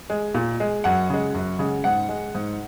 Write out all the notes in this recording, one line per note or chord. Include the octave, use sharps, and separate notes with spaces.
G#3
A#2
G#3
F#2 F#5
C#3 G#3
F#2
C#3 G#3
G#2 F#5
G#3
G#2